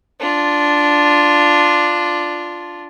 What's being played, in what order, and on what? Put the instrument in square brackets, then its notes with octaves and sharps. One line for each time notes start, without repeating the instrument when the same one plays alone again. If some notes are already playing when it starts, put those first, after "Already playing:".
[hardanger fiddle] D4 F4